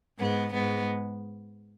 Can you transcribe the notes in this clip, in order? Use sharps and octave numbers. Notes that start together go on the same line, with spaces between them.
G#2 G#3 B3
G#2 G#3 B3